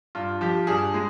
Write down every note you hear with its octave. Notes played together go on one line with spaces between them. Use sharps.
G2 F4
F3 G4
G2 G#4
G#3